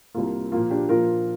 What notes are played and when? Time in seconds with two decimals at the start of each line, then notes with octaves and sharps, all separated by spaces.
0.14 C2 C3 A#3 F4
0.52 A#2 F3 A#3 F4
0.71 D4 G4
0.89 A#2 F3 A#3 F4 A#4